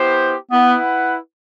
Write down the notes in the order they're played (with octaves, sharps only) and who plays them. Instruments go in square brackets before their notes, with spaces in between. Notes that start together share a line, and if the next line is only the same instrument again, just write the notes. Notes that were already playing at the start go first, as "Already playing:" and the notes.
Already playing: [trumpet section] B3 E4 G4 C5
[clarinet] B3 [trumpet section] E4 B4 F#5